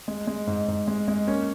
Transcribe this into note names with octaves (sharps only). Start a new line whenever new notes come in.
G#3
G#3
G#2
G#2
G#3
G#3
A#3 C#4 C#5